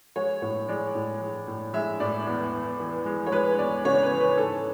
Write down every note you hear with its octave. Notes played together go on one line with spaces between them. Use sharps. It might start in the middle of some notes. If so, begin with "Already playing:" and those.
G#3 C#5
A2 C#5
G#3 D5
A2
G#3
A2
G#3 E5
A2 D5
E2
E2
E3
G#3
C#5
G#3 B4
E2 D5
C#3 C#5
B4
E3
B4
G#2 A4